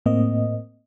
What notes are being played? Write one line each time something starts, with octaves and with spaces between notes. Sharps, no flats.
A2 A#3 C4 D#5